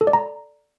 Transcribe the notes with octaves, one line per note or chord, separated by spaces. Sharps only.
A4
D5
A#5